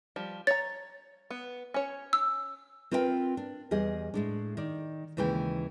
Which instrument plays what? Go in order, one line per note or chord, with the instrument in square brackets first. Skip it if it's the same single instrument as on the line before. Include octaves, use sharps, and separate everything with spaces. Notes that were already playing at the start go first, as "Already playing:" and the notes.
[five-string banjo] F3 G3
[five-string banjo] C#5 A#5 [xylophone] A6
[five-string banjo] B3
C#4 C#5
[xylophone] E6
[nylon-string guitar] C4 F4 A#4 B4 D5 G5
D4
E2 G3 G#4 D#5
A2 G#3 D4
D#3 D5
D#2 C#3 E3 G#3 G4 G5